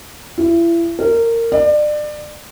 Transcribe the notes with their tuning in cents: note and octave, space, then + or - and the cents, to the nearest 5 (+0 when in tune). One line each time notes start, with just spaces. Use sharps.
E4 +35
A#4 -20
D5 +30